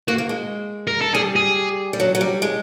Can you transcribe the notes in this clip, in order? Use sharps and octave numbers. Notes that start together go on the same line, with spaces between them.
A#3 F#4
A#3
G#3
A#4
A4
G3 G#4
G#4
G3
F#3
F#3
G3
G#3